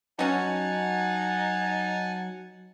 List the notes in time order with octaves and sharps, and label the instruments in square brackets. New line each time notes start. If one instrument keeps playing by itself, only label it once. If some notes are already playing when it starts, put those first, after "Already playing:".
[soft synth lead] F#3 [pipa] C#4 F#4 [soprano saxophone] D#4 [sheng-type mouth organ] F#5 G#5 A5